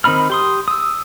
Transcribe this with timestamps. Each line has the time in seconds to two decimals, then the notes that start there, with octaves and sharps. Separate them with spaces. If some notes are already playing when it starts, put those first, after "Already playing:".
0.04 D#3 C4 D#4 B5 F6
0.30 G4 C6 D#6
0.68 D#6 E6